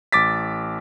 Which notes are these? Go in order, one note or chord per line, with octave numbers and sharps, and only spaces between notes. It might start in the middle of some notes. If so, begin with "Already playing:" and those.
A1 D6 A6 B6